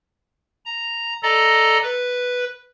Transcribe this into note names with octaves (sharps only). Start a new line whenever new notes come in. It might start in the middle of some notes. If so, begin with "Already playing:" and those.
A#5
A4 D5 D#5 A#5
B4